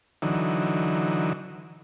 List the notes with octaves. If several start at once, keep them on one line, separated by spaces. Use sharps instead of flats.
D3 E3 F#3 D#4